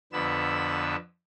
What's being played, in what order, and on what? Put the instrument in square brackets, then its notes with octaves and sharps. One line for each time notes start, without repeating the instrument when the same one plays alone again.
[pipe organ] F2 D3 B3 B4 E6